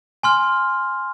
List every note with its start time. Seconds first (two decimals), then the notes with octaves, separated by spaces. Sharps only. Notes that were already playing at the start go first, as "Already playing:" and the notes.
0.23 G#5 C6 F6